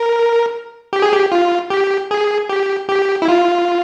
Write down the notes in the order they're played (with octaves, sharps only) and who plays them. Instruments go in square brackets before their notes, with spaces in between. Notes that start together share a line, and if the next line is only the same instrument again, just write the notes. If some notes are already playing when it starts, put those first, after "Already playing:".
Already playing: [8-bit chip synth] A#4
G4
G#4
G4
F4
G4
G#4
G4
G4
E4
F4